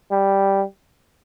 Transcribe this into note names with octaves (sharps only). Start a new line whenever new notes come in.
G3